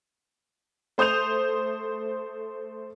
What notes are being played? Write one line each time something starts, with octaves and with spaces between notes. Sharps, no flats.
A3 C5 D#6 G6 F7